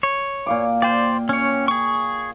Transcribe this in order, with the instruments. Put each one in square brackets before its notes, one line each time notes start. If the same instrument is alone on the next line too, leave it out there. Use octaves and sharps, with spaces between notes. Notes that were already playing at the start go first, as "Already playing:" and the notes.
[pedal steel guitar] C#5
[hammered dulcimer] A#2 F5 D6
[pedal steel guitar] C5 D5 [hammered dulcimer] G5
[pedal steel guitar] C#4 C#5
G#4 C#6